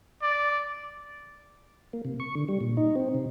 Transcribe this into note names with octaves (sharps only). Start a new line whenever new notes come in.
D5
A#3
C3
C#6
D3
G3
A#2
D#4
C4
C3